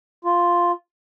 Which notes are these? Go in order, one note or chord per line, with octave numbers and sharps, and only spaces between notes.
F4